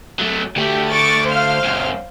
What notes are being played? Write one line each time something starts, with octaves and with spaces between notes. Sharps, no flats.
F#3 A3
D2 A3 G4
C#6 D6 A6
C5 F5 F6
C#2 F#2